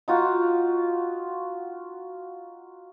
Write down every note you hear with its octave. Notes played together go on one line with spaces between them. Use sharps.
D#4 F4 F#4